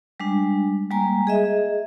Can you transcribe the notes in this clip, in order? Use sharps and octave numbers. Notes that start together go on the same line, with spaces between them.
G3 G#3 D4
G3 G#3 A#3 G#5 A#5
G#4 D#5 E5